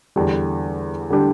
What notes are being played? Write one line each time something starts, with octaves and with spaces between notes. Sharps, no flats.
E2 D3 G3 D4 G4
D3 G3 D4 G4